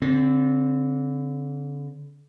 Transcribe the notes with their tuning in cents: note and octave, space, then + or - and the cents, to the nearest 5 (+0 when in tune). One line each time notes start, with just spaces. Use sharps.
D3 -35 C4 +0